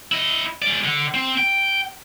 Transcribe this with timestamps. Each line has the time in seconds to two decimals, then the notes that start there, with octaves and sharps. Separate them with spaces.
0.12 E4 D#5
0.62 G#3 D5
0.84 D3
1.15 C4
1.38 G5